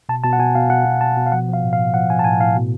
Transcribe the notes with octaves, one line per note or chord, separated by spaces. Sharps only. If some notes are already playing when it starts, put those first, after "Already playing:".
B2 A5
B2 A5
F#5
B2 G#5
B2 F5
B2 F#5
B2
B2 A5
B2
F5
F3 F#5
F3
F5
A2
F5
A2
F3 F#5
F3 G#5
A5
A2 G#5
A2 F5
B2